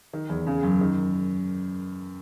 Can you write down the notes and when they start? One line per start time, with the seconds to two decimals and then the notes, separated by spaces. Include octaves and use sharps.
0.13 D#3
0.29 E2
0.47 C#3
0.63 F#2
0.81 D#3